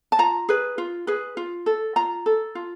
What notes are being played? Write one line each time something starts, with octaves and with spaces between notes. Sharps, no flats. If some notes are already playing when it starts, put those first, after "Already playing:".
A5
F4 A#5
G#4 B4
F4
G#4 B4
F4
A4
F4 A#5
A4
F4